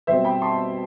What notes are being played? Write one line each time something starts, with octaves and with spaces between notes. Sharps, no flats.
B2 G3 C4 C5 E5
G5 B5
A5 C6